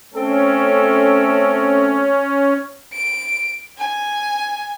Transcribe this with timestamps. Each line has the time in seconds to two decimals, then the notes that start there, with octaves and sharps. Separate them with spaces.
0.14 A3 C4 C#4 A4
2.93 D7
3.78 G#5